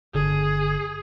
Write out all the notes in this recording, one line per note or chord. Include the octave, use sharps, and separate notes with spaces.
G1 D3 G#4